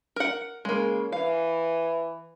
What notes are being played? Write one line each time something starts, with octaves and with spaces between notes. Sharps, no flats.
A#4 F#5
C#3 G#3 A#3
E3 F5